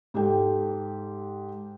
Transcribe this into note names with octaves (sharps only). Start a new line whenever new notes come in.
G#2 G4 A4 G5